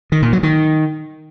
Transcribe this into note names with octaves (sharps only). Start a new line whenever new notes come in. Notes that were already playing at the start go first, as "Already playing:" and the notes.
D#3
A#2
F#3
D#3